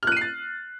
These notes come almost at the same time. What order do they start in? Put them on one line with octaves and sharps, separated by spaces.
F6 F#6 D#7 C7 A6